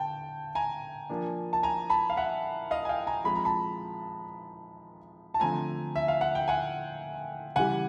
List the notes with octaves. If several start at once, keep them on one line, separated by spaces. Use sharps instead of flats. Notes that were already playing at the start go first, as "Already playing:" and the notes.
Already playing: D3 G5 A5
G#5 A#5
F3 A#3 D4
A5
G#5 A#5
A5 B5
F5
E5 F#5
D#5 F5
G#5
F5 G5
G#5 A#5
F3 G#3 C4 B5
A#5
A5 B5
A5
D3 F3 A3 C4 G#5 A#5
E5
F5
F#5
G5
F#5 G#5
C#3 E3 G3 F#5 G#5